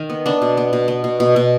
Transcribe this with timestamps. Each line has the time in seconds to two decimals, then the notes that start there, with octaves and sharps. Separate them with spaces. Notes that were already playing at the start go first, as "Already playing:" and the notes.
Already playing: D#3
0.10 B3
0.26 B3 D4
0.42 B2
0.57 B3
0.73 B2
0.88 B3
1.04 B2
1.20 B2
1.36 B2